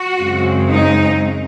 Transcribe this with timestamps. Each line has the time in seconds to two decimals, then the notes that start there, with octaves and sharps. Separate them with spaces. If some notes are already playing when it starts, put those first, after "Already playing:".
Already playing: F#4
0.18 F#2 C#3 G#3 C4
0.70 D#4